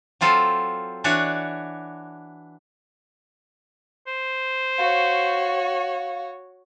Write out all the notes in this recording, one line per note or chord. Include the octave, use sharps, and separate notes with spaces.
F#3 C4 F4 A4 C5
E3 D4 F#4 C#5 D5
C5
F#4 C#5 F5